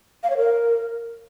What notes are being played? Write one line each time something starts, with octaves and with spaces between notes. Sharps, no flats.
F5
C#5
A#4